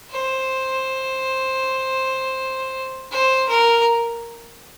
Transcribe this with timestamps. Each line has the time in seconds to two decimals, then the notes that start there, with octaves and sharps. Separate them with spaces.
0.11 C5
3.12 C5
3.49 A#4